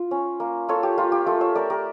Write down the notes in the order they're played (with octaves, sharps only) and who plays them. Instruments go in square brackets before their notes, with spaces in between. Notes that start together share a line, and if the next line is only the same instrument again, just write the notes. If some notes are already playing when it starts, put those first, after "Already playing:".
Already playing: [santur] F4
C#4
A#3
F4 A4 C#5
G4
A#3 F4
G4
A3 F4 A4
C#5 E5
A3 A#4 D5
G4 A#4